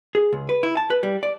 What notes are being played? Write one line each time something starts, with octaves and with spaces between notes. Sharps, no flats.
G#4
C#2
B4
E4
A5
B4
G3
D5